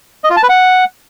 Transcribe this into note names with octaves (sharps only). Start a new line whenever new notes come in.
D#5
F4
A5
B4
F#5